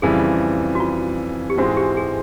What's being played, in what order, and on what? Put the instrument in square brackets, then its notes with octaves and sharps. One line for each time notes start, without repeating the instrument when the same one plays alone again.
[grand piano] F2 C#3 E3 G3 [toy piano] G#4
[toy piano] F#4
F4
G4
[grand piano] G#2 E3 G#3 C4 [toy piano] F#4
[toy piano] G4
G#4